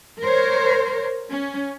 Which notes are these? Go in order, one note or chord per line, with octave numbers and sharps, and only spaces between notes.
A#4 C5 C#5
C#4